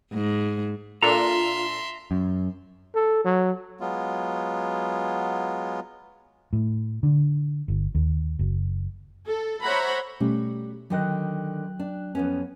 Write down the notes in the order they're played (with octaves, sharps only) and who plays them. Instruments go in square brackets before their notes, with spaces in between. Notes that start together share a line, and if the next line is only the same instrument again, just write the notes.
[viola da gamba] G#2
[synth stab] A#2 D4 A4 [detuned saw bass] F4 [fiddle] E5 C6 [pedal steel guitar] A#5
[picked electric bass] F#2
[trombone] A4
F#3
[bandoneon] F#3 G#3 B3 F4
[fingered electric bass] A2
D3
G1
D#2
F#1
[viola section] A4
C5 C#5 E5 F#5 A#5 B5
[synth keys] B2 A3 C#4 [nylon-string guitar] G3
[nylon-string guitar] D3 D#3 D#5 [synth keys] F#3 G5 F#6
[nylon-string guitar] D4
F2 B3 C#4